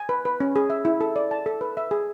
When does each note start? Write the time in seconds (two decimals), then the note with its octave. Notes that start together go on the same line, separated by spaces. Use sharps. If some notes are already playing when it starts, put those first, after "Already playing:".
Already playing: G#5
0.09 B4
0.25 B4
0.40 C#4
0.56 G#4
0.70 E5
0.85 E4
1.01 A4
1.16 D5
1.31 A5
1.46 A4
1.61 B4
1.77 E5
1.91 G#4